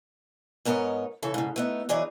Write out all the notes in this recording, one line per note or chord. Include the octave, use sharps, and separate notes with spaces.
G#2 B3 A#4 C#5 D#5
C#3 E3 A4
G#2 C#3
A3 B3 D#4
E3 F#3 D#4 G#4 D5